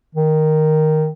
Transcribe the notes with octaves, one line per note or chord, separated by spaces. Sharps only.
D#3